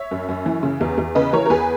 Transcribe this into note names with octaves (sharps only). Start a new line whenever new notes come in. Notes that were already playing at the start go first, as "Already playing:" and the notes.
Already playing: C#5 E5
F#2
F#2
E3
C#3
E2
E2
C#3 B4 D#5
E3 A#4 C#5
A#4
E2 G#4 B4